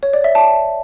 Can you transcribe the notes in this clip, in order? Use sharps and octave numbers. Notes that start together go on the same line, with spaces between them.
C#5
D5
E5
A5